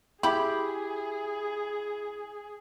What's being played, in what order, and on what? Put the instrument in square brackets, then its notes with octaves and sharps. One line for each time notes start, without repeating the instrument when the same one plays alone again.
[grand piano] E4 [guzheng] G4 [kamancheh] G#4 [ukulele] B5